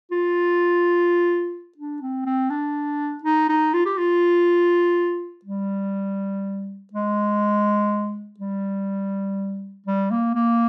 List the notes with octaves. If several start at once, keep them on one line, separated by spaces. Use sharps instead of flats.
F4
D4
C4
C4
D4
D#4
D#4
F4
G4
F4
G3
G#3
G3
G3
A#3
A#3